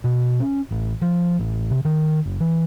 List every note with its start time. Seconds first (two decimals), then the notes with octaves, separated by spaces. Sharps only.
0.04 B2
0.40 C#4
0.71 A1
1.02 F3
1.39 A1
1.70 C3
1.85 D#3
2.25 F#1
2.40 E3